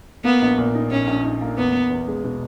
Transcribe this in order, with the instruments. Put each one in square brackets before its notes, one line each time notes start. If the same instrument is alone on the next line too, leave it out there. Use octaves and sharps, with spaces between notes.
[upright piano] A#3 [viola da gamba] B3
[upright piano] A#1
A#2
D#4
[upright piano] A#1 [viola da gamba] C#4
[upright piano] A#1
D#4
A#3
[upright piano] E2 [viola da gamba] B3
[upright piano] E2
E2
G#3
B2